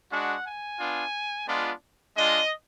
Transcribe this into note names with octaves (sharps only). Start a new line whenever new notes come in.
G#3 D4 F#4 F#5
G#5
B3 D4 F4
G#3 B3 D4 F4
G#3 D4 F4 D#5